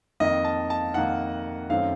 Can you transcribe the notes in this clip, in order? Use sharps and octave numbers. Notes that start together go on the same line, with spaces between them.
F2 D#3 A#3 D#5
A5
A5
F2 D#3 A#3 F#5
F#2 D#3 A3 C4 F5